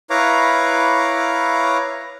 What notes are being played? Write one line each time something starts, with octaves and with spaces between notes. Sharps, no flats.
E4 B4 C#5 F5 A#5 D6